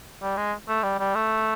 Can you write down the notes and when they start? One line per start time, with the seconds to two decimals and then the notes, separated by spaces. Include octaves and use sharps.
0.22 G3
0.37 G#3
0.69 A3
0.83 G3
0.99 G3
1.15 A3